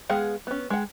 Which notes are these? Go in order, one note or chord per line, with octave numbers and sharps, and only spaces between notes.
G#3 B3 G#4 F5 F#5
B3 C#4
G#3 F#5